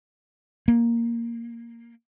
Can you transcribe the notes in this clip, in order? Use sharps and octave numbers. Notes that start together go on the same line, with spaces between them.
A#3